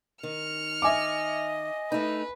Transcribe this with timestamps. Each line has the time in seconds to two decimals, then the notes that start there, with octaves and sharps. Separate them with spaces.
0.23 D#3 F6 C#7
0.82 D#5 E5 G#5 D6
1.92 A3 D#4 B4